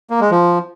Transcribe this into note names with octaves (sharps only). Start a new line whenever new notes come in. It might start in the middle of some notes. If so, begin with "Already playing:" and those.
A#3
G#3
F3